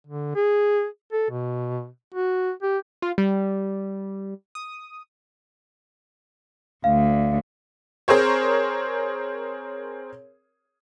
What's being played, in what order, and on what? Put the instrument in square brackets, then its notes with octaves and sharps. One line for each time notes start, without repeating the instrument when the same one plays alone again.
[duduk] D3
G#4
A4
B2
F#4
G4
[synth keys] F4
G3
D#6
[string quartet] D2 [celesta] F5
[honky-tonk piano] C4 G#4 A#4 C5 C#5